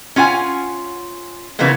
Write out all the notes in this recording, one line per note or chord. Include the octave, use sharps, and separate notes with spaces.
C#4 F4 F#5 G#5
C#3 E3 F3 A#3 B3